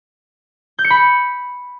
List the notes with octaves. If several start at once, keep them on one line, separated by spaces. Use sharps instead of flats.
G6
C#7
B5